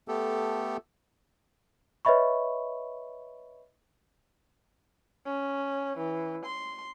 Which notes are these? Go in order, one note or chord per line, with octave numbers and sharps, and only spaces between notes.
A3 B3 G4 A4
B4 C#5 D#5 E5 B5 C#6
C#4
E3
C6